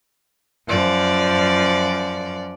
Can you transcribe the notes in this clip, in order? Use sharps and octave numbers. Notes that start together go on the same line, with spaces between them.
F#2 F3 D5